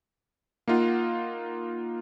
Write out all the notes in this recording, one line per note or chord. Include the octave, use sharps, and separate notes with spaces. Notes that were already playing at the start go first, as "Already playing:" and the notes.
A#3 D#4 F4 F5 F#5